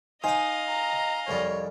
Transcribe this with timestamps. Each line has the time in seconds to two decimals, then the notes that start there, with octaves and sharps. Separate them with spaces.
0.24 D#4 C5 D#5 F5 G5 G#5 D#6
0.69 A#5
1.28 C2 F2 G3 C#5